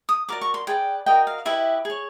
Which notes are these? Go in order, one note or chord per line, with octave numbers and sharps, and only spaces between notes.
D#6
F#4 A#4 D5 D6
C#6
C6
G#4 B4 D5 G5
F#4 A#4 D#5 G5
F5
E4 G4 B4 D#5 E5
G#4 C#5